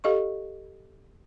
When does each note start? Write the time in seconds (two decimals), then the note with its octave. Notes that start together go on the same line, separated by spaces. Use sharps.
0.04 G4 A4 D#5 F5 C#6